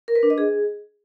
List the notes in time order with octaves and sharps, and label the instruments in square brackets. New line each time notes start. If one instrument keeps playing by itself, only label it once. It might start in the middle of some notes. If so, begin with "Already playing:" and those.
[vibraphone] A#4
B4
D4
D#5
G#4